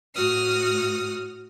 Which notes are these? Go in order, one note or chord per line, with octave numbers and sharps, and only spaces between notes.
A2 F#4 D#6 F6